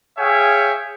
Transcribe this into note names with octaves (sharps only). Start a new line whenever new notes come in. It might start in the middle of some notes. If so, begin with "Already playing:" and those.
G#4 C#5 E5 F5 G5 G#5